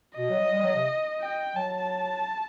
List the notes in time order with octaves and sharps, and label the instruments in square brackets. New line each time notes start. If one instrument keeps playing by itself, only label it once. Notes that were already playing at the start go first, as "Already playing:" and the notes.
[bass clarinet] B2 [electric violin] D#5
[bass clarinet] F#3
F#3
G3
F#3
C3
[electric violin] G5
[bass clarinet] F#3 [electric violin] A5